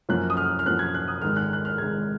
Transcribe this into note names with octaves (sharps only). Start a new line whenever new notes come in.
F#2 F3 A#3 C#4 F#6
D#6
F6
F6
F#2 F3 A#3 C#4 F#6
G#6
F#6
D#6
G#1 G#2 D#3 G#3 F6
F#6
F#6
F6
G#1 G#2 D#3 G#3 G#6